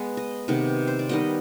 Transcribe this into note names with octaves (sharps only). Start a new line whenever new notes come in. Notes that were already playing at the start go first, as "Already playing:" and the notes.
Already playing: G#3 B3
D#5
C3 D#3 B3
C5
D5
D#3 G3 B3 D#5